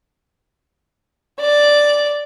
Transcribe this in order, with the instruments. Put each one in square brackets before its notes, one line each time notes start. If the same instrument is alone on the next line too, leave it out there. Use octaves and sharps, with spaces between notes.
[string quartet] D5